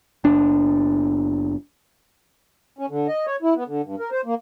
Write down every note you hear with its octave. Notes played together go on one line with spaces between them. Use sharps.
F#1 D4
C#4
D3
D#5
C#5
E4
B3
D3
G2
A#4
C5
A#3